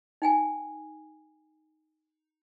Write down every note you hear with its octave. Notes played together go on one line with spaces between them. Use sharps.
D#4 G5 G#5